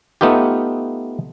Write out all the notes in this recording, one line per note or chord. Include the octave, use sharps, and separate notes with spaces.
A3 B3 D#4 F4 G4